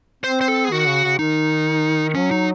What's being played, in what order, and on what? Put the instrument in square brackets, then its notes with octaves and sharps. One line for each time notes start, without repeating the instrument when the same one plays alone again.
[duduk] C4 [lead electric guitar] C5
[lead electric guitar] C5
A4
G#4
[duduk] D#3 [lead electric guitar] F#4
[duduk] C#3
C#3
[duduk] D#3 [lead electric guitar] D#4
[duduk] F#3 [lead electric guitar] C#4
[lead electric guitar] D#4